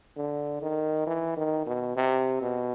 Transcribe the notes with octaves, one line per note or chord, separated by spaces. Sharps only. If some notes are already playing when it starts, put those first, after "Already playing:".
D3
D#3
E3
D#3
B2
C3
B2